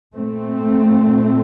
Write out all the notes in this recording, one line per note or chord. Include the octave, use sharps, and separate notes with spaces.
A#2 A3 C4